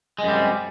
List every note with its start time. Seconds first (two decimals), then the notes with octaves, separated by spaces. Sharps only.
0.19 G#3
0.23 F#2
0.28 G3
0.33 C3